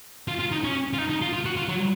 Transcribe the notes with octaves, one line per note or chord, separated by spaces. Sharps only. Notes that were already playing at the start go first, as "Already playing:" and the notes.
F4
F4
D#4
C#4
F4
D#4
D#4
F4
F4
F#4
F4
F#3